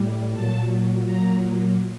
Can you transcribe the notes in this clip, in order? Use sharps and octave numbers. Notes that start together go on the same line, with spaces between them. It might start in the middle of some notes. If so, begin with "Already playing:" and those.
Already playing: A2 G3
A#2 F#3 A5
A#2 F#3 A#5